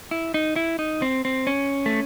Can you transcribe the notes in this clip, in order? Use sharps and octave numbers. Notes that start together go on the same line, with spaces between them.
E4
D#4
E4
D#4
C4
C4
C#4
A3